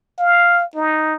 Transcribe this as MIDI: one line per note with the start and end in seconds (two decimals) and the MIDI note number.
0.19 0.64 77
0.75 1.15 63